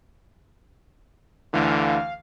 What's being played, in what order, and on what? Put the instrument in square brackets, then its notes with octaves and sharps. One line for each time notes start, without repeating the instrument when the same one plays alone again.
[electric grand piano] D2 E3 [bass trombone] D3 [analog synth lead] F5